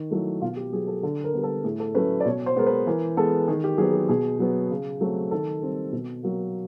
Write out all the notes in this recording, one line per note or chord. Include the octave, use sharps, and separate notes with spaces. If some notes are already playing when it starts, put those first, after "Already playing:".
Already playing: D#3
F#3 A3 E4
B2 F4
G4
F#3 B3 G#4
A4
D3 A4
A#4
G3 B3
A4
A2 G#4
A4
F#3 A3 C#4 B4
D5
B2 C#5
C5
G#3 B3 A#4
B4
E3 A#4
G#3 B3 A4
D#3 G#4
G4
F#3 B3 G#4
G4
B2 G#4
F#3 B3
C#3
F#3 A3 C4
D#3 A4
G3 C4
B2
F#3 A#3